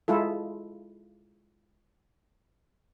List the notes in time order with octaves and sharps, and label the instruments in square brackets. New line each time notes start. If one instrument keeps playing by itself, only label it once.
[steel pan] G#3 E4 F4 A4